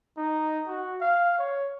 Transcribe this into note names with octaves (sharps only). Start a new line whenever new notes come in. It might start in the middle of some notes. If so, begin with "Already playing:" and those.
D#4
F#4
F5
C#5